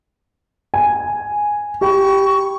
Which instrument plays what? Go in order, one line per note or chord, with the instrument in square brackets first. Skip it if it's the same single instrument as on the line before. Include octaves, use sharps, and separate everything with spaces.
[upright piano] G#5
[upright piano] G4 G5 B5 [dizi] C#6